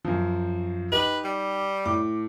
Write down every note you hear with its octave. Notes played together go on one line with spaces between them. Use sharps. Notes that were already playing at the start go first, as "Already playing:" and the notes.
F#2 F3
D#4 G4 B4 D#5
G3
A2 D6